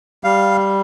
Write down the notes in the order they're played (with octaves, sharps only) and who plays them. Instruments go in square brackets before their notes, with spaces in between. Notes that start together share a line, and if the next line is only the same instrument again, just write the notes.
[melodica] G3 F5